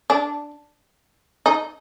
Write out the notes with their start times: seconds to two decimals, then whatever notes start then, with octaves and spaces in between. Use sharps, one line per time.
0.10 D4
1.46 D#4